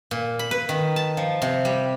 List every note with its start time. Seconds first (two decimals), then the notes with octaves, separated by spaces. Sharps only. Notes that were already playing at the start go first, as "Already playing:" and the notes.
0.11 A#2
0.39 B5
0.51 B4
0.69 D#3
0.96 A5
1.17 F3
1.42 C3
1.65 G3